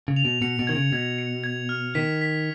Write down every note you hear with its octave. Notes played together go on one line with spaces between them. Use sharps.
C#3
F7
B2
B2 C#7
B2
D#3 G#6
C#3
B2 G#6
C#7
G#6
F6
D#3 B6
B6